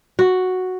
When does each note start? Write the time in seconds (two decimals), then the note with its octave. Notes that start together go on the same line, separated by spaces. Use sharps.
0.19 F#4